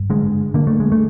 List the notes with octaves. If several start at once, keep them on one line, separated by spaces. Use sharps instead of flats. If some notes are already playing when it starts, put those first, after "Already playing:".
Already playing: G2
D3 G#3
D3 A#3
A3
G#3
A3